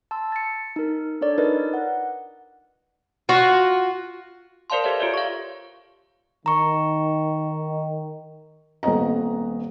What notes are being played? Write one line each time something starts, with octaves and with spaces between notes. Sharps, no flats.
A5 C6 E6
A6 C#7
D#4 A#4
D4 A4 C#5 D5
D#4 F4 A#4 B4 D5 D#5
F#5
F4 F#4
A#4 C5 D5 F5 A5 C6
G4 A4 B4 C#5 E5 F5
F4 G4 C#5 D5 E5
F5 C#6
D#3 A#5 C#6
D#1 B3 C4 D#5 A#5